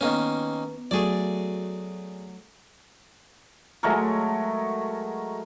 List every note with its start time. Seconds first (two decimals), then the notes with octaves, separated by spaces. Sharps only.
0.01 D#3 A#3 B3 C#4
0.91 F#3 A3 F#4 G#4 D5
3.83 F#3 G#3 A3 A#4